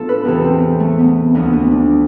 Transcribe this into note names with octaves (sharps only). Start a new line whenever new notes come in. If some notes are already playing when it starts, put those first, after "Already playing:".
Already playing: A2 F3 B3 D4 F4 A4
B4
E2 C3 E3 A4
C4
A3
B3
D2 D3 F3 B3
B3
D4